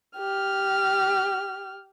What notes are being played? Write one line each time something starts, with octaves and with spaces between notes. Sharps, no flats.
G4 F6